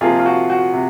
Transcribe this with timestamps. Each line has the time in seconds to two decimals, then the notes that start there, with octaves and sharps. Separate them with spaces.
0.01 C3 F3 A#3 F4 G#4
0.20 F4
0.26 F#4
0.50 F#4
0.74 C3